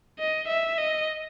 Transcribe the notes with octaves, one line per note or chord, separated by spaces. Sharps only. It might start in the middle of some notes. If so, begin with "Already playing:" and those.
D#5
E5
D#5